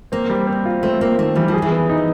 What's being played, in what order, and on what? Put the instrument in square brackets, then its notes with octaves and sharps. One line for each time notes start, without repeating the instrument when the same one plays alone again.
[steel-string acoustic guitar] A#3 [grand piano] C4
[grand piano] G3
C4
F4
[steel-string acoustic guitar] A3 [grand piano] C4
[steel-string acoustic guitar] A#3 [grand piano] C4
[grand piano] D#3 [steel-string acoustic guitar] A3
[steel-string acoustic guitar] E3 [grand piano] G3
[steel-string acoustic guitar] F3
[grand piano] G#4
[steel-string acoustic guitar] E3
[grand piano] B3
D#4